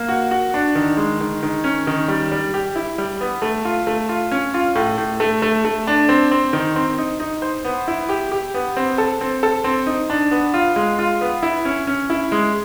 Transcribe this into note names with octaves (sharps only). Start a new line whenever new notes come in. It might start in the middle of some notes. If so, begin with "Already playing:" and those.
Already playing: A#3
F#4
F#4
D4
D#3
G#3
D#3
D#3
C#4
D#3
G3
G3
G4
E4
G3
B3
A3
F4
A3
F4
C#4
F4
A2
A2
A3
A3
A3
D4
C4
C4
D#3
C4
D#4
D#4
C5
B3
E4
G4
G4
B3
C4
A4
C4
A4
C4
D#4
D4
B3
F4
G#3
F4
B3
E4
C#4
C#4
E4
G#3